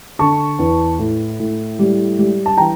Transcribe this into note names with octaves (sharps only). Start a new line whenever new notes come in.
D3 A5 C#6
E2
A2
A2
G3
G3
A5
E3 G5 A#5